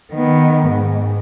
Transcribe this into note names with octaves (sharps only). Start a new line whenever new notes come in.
D#3 B3
G#2